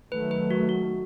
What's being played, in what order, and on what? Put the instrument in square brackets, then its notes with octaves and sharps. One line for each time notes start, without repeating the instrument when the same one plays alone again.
[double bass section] D#3 F#3 A3 [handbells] B4
[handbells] B4
F#4
F#4